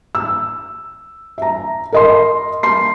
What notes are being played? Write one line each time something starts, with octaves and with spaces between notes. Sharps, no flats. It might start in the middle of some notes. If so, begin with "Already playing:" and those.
E6
E5 A#5
A#4 D#5 C6
C6 C7